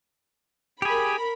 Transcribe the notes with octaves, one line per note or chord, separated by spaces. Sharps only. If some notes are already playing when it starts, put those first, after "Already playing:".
G4 G#4 A#4 B5